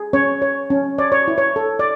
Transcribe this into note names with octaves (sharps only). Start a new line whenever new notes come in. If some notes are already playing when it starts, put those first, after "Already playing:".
Already playing: G#4
C#4 C#5
C#5
C#4
C#5 D5
C#5
E4
C#5
A4
D5